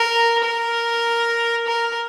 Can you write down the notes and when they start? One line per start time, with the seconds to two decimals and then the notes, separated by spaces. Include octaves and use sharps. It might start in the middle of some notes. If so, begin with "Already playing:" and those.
Already playing: A#4
0.44 A#4
1.67 A#4